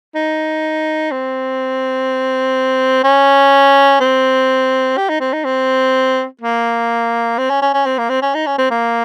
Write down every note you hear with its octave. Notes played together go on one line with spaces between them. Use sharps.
D#4
C4
C#4
C4
G4
D#4
C4
D#4
C4
A#3
C4
C#4
C#4
C#4
C4
A#3
C4
C#4
D#4
C#4
C4
A#3